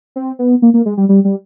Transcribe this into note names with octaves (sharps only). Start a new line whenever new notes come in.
C4
B3
A#3
A#3
G#3
G3
G3
G3